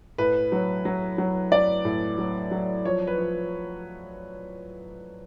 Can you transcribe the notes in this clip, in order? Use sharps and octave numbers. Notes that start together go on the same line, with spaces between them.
A2 B4
F#3
F#3
F#3
F#3 D5
A2
F#3
F#3
F3 C#5
B4
F3